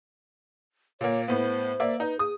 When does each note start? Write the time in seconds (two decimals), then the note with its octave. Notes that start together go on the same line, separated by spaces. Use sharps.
1.01 A#2 A#3 C#5
1.28 A2 B3 C5
1.80 A#3 D5 E5
2.00 D#4 B4
2.19 G#4 D#6